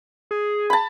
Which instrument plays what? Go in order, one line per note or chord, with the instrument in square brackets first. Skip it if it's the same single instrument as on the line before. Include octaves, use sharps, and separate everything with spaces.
[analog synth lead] G#4
[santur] A5 B5